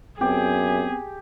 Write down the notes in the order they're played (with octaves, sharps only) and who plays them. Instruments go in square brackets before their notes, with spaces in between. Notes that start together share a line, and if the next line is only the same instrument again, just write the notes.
[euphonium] F#2 [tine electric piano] B3 C4 [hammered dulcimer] G4 [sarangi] G#4